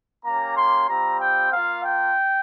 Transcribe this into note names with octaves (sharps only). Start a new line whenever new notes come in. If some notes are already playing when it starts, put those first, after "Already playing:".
A#3 C#4 G4 A#5
C6
G3 C4 F4 A#5
G5
A#3 F4 F5
G5